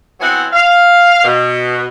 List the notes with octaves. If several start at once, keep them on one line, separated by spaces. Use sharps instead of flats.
F#3 B3 C4 E4 F#5 G#5
F5
B2